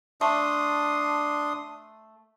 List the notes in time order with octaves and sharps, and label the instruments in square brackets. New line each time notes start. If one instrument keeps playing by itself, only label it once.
[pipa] A3 [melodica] D4 C6 D#6